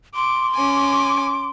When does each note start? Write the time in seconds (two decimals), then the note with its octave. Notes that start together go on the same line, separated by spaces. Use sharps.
0.15 C6 D6
0.55 C#4 G#5 D6